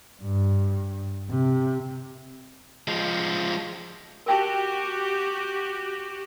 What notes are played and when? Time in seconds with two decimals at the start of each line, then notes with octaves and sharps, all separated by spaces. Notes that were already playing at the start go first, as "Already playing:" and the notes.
0.23 G2
1.30 C3
2.88 F3 G#3
4.26 F#4 G4 A#4 G5 A5